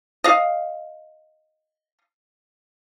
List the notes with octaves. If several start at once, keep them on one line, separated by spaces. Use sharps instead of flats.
D#5 F5